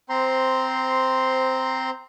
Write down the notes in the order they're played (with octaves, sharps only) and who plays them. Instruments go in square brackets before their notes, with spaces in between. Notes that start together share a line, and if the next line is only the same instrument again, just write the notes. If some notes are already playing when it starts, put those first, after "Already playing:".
[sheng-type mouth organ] C4 C5 A#5 C6